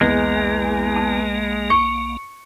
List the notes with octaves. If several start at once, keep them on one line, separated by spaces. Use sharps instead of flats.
B1 E2 G#3 A#3
A5
C#6 C#7